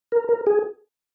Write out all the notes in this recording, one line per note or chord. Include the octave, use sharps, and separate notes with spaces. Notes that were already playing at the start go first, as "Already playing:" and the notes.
A#4
A#4
G#4